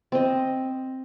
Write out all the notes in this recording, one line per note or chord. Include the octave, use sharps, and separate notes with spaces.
C4 D#5